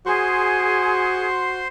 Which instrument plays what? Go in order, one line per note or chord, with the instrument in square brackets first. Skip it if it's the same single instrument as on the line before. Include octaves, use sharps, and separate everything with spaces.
[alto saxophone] F#4 [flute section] G#4 [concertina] C5 C6